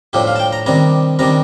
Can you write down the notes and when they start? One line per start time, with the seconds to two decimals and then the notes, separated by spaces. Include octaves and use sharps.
0.13 A2 F3 A3 D4 G4
0.27 F5
0.36 A5
0.40 G5
0.53 A#5
0.66 C3 D#3 G3 D4 A#5
1.19 C3 D#3 G3 D4 A#5